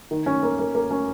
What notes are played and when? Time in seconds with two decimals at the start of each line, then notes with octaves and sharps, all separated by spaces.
0.11 D#3
0.26 C#4
0.43 A#3
0.59 A#3
0.75 A#3
0.91 C#4